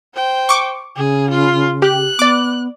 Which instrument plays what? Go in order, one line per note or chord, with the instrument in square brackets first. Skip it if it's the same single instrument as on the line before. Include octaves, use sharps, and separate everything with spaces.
[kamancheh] C5 G5
[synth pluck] C#6 D6
[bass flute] C#3 [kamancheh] G#4
[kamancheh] F4
[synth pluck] G4 [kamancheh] F#6
[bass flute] B3 [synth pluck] D5 D6